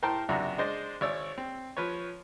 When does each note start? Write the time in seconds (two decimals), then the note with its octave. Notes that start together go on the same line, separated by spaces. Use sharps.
0.02 A2 A#4 C5 G5 A5 C6
0.29 C#2 F#2 C3 D4 F#4 A#5
0.58 G#3 D4 C5 D5 D#5
1.01 G#1 C#5 D5 E6
1.38 C4
1.77 F3 B4 C#5